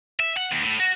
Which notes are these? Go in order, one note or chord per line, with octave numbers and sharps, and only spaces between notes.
E5
F#5
D#2
A2
F#4